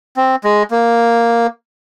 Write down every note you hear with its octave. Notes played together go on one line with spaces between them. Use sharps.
C4
G#3
A#3